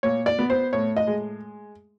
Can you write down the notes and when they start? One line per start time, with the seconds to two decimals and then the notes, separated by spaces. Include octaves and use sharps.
0.03 A#2 C#5
0.26 D5
0.39 B3
0.50 C5
0.73 A2 C#5
0.97 D#5
1.07 G#3